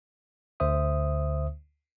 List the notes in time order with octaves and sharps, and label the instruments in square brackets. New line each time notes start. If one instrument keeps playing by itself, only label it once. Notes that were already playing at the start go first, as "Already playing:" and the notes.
[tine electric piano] D2 D3 C5 E5 D#6